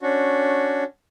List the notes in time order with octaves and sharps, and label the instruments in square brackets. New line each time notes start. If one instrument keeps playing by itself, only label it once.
[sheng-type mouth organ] C#4 D4 F#4